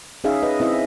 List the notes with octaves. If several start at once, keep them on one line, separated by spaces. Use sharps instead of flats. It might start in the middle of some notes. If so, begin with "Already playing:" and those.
C#4 D#4 G#4 E5 F5
B4 D#5
C4 E4 D#5 E5